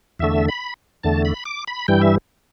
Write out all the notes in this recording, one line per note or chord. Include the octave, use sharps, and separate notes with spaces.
E2 D3 A3 E5
B5
E2 D3 A3 A5
B5
D6
B5
G2 E3 G3 G5
E5